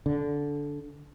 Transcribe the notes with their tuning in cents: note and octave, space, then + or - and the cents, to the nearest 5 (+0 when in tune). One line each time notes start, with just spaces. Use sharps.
D3 -15